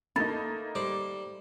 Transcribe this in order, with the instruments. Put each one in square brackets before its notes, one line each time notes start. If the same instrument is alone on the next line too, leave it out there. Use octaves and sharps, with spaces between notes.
[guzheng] A3 [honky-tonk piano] A#3 D#4 [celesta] B5 A6
[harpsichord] G3 C5 D6